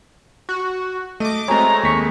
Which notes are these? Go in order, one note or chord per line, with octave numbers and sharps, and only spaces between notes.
F#4
A3 D#5 D6
G#3 A3 C4 F#4 C#5 A#5
D#2 C#6 B6